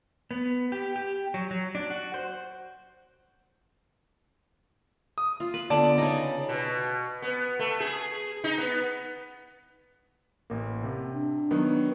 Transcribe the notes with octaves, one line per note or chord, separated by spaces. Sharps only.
B3
G4
G4
F#3
F#3
D4
F#4
C5
D#6
F4
B4
D3 B3 D5 A5
C#3 D#4
B2
B3
A3
G#4
D#4
B3
A1 A#3
C3
D4
D#3 F#3 B3